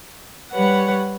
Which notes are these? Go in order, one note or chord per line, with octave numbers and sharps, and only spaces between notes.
G3 B4 C#5 F#5